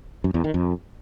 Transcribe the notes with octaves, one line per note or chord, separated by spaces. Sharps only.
F#2
E2
D#3
F2